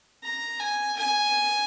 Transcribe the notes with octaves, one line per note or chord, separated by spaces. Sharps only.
A#5
G#5
G#5